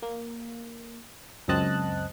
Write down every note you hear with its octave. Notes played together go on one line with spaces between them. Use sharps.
A#3
C#2 F#2 C4 D#5 A5 F#6